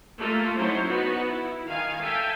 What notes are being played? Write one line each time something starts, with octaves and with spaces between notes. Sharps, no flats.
A3 A#3 F4 A4
F#3 C#4 D#4 E4 C5
B3 D#4 F#4
E4
D#3 F5 G#5
A4 E5 F5 G5 G#5